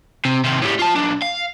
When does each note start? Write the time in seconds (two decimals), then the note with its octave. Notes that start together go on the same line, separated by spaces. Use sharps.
0.25 C3
0.44 C3 D#3
0.62 A2 G3
0.79 F4 A5
0.95 B1 D4
1.22 F5